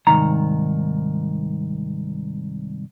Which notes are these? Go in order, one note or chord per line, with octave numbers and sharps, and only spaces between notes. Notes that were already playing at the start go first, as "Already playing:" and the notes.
C2 G#2 D#3 A#5